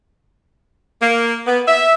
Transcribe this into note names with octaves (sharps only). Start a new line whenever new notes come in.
A#3
B3
E5